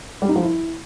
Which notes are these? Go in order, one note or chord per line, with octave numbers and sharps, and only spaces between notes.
G3
D#4
F3
E4